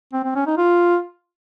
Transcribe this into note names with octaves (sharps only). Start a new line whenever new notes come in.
C4
C4
C#4
D#4
F4